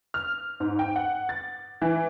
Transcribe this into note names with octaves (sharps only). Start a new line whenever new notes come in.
F6
G#2
G5
F#5
A6
E3